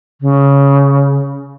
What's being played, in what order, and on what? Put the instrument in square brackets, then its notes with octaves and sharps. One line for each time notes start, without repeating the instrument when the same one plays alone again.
[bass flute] C#3